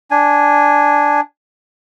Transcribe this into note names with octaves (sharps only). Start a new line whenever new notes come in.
D4 G#5